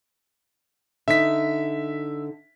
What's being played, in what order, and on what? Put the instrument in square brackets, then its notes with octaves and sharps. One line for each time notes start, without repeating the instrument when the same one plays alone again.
[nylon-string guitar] D3 D#4 [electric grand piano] E5 B6